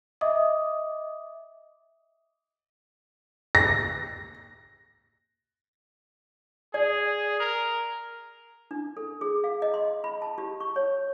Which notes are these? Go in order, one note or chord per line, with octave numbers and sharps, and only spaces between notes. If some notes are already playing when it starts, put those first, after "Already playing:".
D#5 E5 D6 D#6
A#6
G#4 D5
A#4
D4
A4
G#4
F5
D#5
C6
B5
A5
G4
C#6
C#5